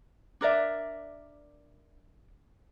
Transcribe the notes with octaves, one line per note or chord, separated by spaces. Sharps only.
D4 A#4 D5 E5